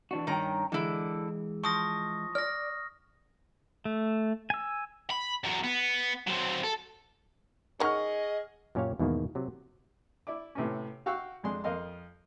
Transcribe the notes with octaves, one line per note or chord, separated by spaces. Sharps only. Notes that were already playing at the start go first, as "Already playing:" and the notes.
E3 D4 F#4
G2 D#3 C#4 G5 A#5
D3 E3 G#3 E4
F3 C#6 D#6 A#6
D5 F6 A#6
A3
G#5 E6
B5
E2 F#3
B3
F#3 C4
A4
D#3 C#4 G#4 D#5 F#5 C#6 F6
F#2 A#2 C#4 G4 C#5 F5
E2 G#2 B2 D#3 A#3
C3 F#3
E4 D5 D6
A2 C3 B3 C#4
F#4 F5 G5 C#6 E6 F#6
F2 G#3 D4 C6
F2 A#4 D#5 F5 C6